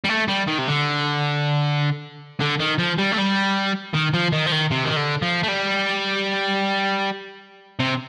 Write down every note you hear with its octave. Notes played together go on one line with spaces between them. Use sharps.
G3
A3
G3
D#3
C3
D3
D3
D#3
F3
G3
A3
G3
D#3
F3
D#3
F3
D#3
C3
D#3
D3
F3
A3
G3
C3